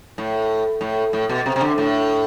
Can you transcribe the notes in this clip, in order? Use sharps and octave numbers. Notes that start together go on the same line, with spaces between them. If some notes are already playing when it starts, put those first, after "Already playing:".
A2
A2
A2
B2
C3
C3
D3
A2